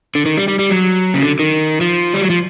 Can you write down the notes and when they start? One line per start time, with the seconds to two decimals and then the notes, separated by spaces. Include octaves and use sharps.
0.15 D3
0.26 D#3
0.37 G3
0.48 G3
0.59 G3
0.70 F#3
1.14 C#3
1.23 D3
1.39 D#3
1.81 F3
2.14 G3
2.22 F#3
2.30 F3